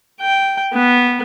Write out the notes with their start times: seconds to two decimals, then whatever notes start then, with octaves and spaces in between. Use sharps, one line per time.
0.21 G5
0.73 B3